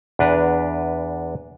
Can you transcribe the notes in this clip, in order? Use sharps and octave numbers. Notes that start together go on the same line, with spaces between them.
E2 D4 B4 A#5